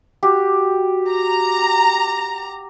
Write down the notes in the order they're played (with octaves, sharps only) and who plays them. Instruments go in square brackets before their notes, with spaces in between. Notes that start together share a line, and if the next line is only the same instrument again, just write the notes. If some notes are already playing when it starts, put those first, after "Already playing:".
[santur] F#4 G4
[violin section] A#5